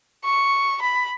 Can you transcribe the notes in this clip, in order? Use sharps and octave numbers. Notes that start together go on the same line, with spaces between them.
C#6
B5